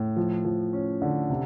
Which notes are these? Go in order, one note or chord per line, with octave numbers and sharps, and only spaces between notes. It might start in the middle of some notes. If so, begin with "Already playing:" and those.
Already playing: A2
F3
F3
C#4
D3
C3